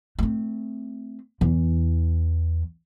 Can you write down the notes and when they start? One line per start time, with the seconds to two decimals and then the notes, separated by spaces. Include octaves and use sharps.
0.19 A3 C4
1.41 E2 E3